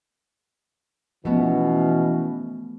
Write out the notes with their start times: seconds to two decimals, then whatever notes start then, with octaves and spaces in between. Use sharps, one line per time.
1.25 B2 E3 F3 A3 B3 C#4 F#4